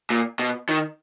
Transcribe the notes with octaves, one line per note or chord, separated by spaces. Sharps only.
A#2
B2
D#3